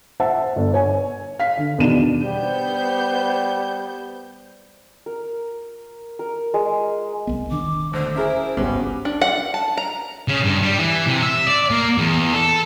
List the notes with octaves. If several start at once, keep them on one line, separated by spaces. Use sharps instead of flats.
C5 E5 F#5 A5
G1
C#5 G#5
F5 B6
D3
E2 B2 D#3 D4 D#7 E7
G3 B3 C5 G6
A#4
A#4
G#3
C2 B3
E1 D#3 D4 D6
D2 D3 C5
C#4 E4 G#4 A#4 E5
G#1 C#2 G2 B3 C#4 G4
D4
F#5
A5
A#5
C#3
G2
G3
E3
C3
E5
D5
A#3
E2
A4